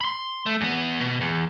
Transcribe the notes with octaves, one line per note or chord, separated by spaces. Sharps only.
B5 C6
A3
E2 B3
B2
E2